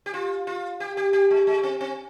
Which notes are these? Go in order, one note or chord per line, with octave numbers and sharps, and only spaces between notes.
G4
F4
F4
G4
G4
G4
G#3
G#3
C4
C4